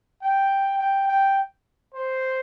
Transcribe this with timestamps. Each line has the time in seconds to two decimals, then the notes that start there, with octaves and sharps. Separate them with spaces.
0.22 G5
0.79 G5
1.07 G5
1.94 C5